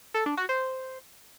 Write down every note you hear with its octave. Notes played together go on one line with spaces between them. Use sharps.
A4
D4
F#4
C5